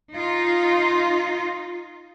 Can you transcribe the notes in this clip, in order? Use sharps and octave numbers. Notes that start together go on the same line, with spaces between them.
D#4 F4